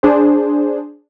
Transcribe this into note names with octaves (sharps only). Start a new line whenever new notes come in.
D4 G#4 C5